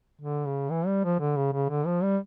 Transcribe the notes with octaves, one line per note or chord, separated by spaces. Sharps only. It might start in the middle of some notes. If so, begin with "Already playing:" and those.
D3
C#3
E3
G3
F3
D3
C#3
C#3
D3
F3
G3